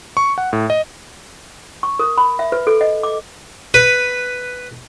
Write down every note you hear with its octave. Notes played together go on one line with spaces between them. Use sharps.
C#6
F#5
A2
D#5
C#6
A#4
B5
E5
B4
A4
D#5
D6
B4